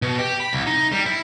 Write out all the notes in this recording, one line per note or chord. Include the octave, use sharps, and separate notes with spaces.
B2
G4
B5
C2
D#4
G3
E4